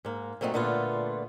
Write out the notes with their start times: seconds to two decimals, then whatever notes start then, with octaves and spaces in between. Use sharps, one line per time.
0.05 G#2 A#3
0.41 A#2 F#3 A3 C4 D#4
0.54 A#2 D3 A3 B3 F4